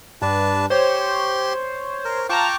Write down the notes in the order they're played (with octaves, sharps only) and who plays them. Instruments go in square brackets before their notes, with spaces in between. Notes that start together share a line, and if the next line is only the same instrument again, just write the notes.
[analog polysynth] G2 [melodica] D4 B4 A5
[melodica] G4 C6 [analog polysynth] C5 C#5
[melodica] A#4
[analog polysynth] F4 A5 A#5 [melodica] G5 C#6 D6